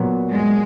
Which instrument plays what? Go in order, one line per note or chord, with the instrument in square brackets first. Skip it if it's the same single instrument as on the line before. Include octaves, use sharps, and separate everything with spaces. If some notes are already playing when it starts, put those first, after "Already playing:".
Already playing: [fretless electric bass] A#2 F#3 B3
[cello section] G#3